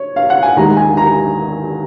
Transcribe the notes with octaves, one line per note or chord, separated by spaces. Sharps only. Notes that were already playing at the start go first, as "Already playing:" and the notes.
Already playing: C#5
F5
F#5
G#5
D#2 D#3 G#3 A#5
G#5
A#5